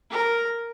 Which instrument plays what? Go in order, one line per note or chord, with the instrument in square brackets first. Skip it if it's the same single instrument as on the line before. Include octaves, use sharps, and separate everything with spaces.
[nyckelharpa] A#4